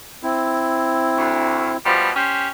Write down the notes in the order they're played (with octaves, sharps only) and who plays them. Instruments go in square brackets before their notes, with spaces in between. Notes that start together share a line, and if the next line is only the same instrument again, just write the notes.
[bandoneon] C4 E4
[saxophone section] D2
B2 F3 G3
C#4 G4 C5